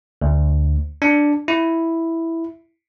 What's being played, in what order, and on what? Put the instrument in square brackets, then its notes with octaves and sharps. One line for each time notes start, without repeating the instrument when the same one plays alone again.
[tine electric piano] D2
D4
E4